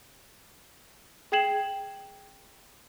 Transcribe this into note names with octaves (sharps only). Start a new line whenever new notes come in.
G#4 G5 G#6 C7 E7 F#7